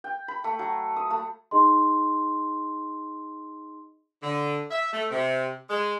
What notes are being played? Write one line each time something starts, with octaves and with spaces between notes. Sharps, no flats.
G5
B5
A3
F#3
D#6
A3
D#4 G#4 D#5 C6
D3
E5
A3
C3
G#3